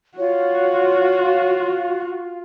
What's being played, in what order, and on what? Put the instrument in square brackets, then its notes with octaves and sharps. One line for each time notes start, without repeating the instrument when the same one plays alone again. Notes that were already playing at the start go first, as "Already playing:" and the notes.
[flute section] F4 [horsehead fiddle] F#4 [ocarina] C#5